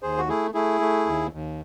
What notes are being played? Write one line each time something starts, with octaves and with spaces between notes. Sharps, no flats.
D#2 G#4 C5
F#4
A3 E4 G#4
A3 E4 G#4
A3
D#2
D#2